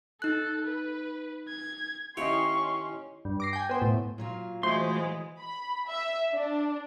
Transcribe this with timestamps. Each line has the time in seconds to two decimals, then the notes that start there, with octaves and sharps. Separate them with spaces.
0.22 D#4 A4 F#6
0.67 B4
1.48 G#6
2.17 D#2 C#4 E4 C#5 D#5 G5 C6 C#6
3.25 G2
3.40 D6 A#6 C7
3.53 G5 G#5
3.69 B3 C5
3.82 A2
4.18 A#2 F#3 F4
4.63 E3 G#3 A3 F#4 C5 C6
5.39 B5
5.87 E5
6.34 D4